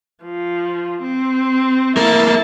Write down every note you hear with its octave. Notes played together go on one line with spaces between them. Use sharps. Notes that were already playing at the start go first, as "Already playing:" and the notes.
F3
C4
A3 A#3 E4 A#4 A5